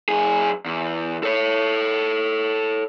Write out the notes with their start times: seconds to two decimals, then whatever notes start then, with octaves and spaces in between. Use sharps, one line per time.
0.09 F#2 G#4
0.66 E2
1.23 A4 C#5